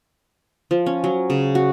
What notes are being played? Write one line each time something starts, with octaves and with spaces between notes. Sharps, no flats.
F3
C#4
F#3
C#3
F#4